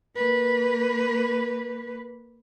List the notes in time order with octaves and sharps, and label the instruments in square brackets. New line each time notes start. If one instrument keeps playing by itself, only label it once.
[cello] A#3 B4